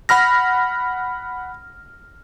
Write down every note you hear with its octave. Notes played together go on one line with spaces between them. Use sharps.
F#5 B5 F6 A#6